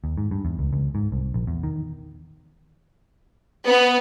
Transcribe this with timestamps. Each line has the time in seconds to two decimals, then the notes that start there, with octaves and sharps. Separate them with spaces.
0.04 D#2
0.17 G#2
0.31 G2
0.45 E2
0.59 C#2
0.73 C#2
0.95 G#2
1.12 C2
1.34 A#1
1.47 E2
1.63 D#3
3.66 B3